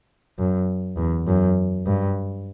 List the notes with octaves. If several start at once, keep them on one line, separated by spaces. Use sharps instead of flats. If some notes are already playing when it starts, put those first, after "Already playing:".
F#2
E2
F#2
G2